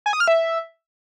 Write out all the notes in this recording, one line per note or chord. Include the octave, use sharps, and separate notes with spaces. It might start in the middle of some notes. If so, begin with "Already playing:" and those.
G#5
D#6
F6
E5